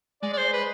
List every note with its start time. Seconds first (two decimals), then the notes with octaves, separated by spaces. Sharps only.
0.22 G#3 D5
0.33 D5
0.38 C5
0.53 B4